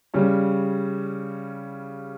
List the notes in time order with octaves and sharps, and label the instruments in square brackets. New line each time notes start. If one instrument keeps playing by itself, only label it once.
[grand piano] C#3 G3 C#4